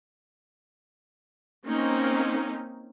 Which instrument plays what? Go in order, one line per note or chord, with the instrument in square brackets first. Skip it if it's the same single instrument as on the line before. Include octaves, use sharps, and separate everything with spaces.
[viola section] A#3 C4 C#4 D#4